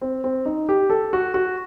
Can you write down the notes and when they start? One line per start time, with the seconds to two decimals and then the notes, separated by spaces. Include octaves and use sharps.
0.01 C4
0.24 C4
0.46 D#4
0.69 G4
0.90 A4
1.13 F#4
1.34 F#4